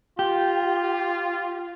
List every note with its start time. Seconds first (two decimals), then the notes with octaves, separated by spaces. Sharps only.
0.19 F4 G4